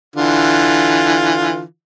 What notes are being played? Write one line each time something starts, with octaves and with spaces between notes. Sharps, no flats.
D3 E3 F4